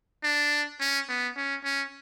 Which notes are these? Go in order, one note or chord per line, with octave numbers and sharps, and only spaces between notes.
D4
C#4
B3
C#4
C#4